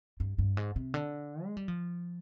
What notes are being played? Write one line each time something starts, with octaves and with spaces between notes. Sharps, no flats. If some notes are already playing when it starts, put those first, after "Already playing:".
G2
G2
G#2
C3
D3
G#3
G3
F3